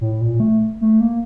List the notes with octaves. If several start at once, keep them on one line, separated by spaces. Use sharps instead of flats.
A2
A#2
A3
A3
A#3